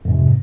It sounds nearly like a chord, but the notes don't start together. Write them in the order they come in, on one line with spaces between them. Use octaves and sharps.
F2 G#2 C3